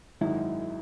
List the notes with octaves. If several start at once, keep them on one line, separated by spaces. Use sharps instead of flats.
G#1 F#2 D#3 G#3 D#4 E4